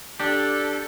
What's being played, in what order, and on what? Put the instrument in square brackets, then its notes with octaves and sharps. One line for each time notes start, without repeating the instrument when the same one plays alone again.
[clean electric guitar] D4 G4 [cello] A4